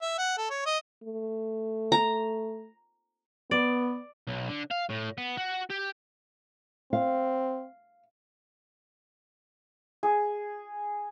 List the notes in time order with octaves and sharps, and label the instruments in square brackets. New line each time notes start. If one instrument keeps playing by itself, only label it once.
[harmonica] E5
F#5
A4
C#5
D#5
[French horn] A3
[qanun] A#5
[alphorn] B3 [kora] D5
[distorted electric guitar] B1
D3
F5
A2
B3
F#4
G4
[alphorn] C4 [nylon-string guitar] F5
[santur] G#4